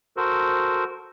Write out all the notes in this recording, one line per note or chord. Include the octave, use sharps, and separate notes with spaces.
F#4 A4 A#4 C5